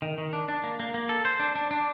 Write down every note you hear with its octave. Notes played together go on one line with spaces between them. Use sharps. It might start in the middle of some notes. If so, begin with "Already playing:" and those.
D#3
D#3
D4
D4
A#3
A#3
A#3
A4
C5
D4
D4
D4